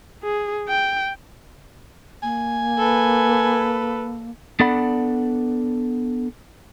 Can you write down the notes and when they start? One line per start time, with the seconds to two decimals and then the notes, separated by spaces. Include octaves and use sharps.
0.24 G#4
0.69 G5
2.23 A#3 G#5
2.78 A4 B4
4.60 B3 D4 A4 D5 F#5 B5